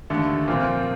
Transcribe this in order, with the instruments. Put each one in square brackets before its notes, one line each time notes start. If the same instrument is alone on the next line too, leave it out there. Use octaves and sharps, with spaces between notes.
[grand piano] D#2 D3 A3
A#2 F3 C4